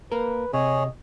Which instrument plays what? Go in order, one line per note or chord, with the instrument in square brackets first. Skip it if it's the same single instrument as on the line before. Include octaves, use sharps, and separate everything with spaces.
[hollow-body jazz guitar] A#3 A#4 [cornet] B4
[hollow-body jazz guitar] C3 [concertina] G#4 C#5 [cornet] D#5